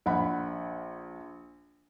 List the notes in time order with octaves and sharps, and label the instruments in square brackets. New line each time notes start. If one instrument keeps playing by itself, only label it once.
[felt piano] A#1 F#5 B5